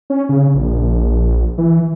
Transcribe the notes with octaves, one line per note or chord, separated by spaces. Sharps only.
C#4
C#3
A#1
E3